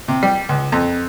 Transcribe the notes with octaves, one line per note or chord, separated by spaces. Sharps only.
C3
G3
C#2
F2